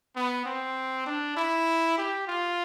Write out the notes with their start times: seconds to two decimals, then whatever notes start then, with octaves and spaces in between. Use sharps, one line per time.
0.16 B3
0.45 C4
1.06 D4
1.37 E4
1.98 G4
2.27 F4